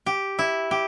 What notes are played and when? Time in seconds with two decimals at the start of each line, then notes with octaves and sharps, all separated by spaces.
0.06 G4
0.39 E4
0.71 G4